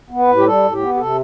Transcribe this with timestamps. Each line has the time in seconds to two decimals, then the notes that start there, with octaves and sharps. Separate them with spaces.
0.10 B3
0.19 B4
0.28 A2
0.36 G4
0.45 G3 A4
0.63 A2
0.72 G4
0.81 B3
0.94 G4
0.98 C3 A4